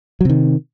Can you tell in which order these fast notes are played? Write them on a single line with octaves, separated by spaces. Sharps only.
F#3 C3 D#3